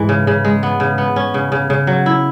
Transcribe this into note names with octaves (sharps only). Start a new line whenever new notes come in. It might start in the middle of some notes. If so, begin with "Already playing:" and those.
Already playing: G#2 E3 G#3
C#3
C#3
G#3
B3
C#3
B3
C#4
C#3
C#3
C#3
F#3
E4